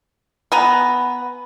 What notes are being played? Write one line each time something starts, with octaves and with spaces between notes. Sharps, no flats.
B3 G#5 A#5